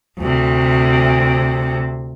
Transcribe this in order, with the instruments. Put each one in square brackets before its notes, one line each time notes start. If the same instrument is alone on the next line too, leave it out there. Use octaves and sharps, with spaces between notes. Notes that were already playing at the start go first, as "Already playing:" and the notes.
[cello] D2 C3